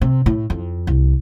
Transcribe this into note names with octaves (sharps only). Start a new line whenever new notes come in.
C3
A2
F2
C2